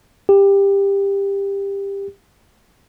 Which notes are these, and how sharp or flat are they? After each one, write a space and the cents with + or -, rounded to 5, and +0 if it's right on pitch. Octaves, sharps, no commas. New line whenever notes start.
G4 +20